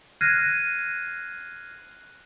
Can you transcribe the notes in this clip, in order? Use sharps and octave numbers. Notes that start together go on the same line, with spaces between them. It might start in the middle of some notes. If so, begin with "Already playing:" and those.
F6 F#6 G#6 A#6 C7 D#7